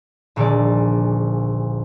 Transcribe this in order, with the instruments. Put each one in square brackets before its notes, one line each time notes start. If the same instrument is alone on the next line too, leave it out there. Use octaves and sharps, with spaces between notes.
[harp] D#1 A#1 D3 G#3 D5